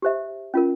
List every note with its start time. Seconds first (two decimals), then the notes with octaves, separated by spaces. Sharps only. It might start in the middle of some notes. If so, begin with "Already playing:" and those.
0.02 G4 C5 E5
0.54 C#4 F4 A#4